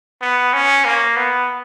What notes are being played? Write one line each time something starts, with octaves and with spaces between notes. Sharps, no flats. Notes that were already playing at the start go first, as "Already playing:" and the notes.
B3
C#4
A#3
B3